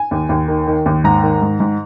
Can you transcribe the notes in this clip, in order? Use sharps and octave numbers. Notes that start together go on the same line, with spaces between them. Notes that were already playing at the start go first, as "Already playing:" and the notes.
Already playing: G#5
D#2
D#2
D#3
D#3
D#2
G#2 A#5
D#3
G#2
G#2